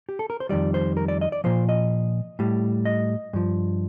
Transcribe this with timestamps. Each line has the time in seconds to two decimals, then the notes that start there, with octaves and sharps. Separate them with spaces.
0.09 G4
0.19 A4
0.30 A#4
0.40 C5
0.49 F2 D#3 G3 D5
0.74 C5
0.97 A#4
1.08 D5
1.21 D#5
1.32 D5
1.44 A#2 F3 C5
1.69 D#5
2.39 A2 G3
2.85 D#5
3.33 G2 F3